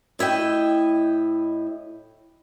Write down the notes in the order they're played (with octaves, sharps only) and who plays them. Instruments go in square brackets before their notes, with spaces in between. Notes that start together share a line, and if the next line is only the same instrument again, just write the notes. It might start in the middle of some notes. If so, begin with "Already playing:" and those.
[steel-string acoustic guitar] A2 E4 D#5 G5